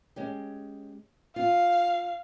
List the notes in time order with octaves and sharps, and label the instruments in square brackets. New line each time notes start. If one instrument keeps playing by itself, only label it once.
[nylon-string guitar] G#3 C#4 G4
[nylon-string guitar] F4 [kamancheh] F5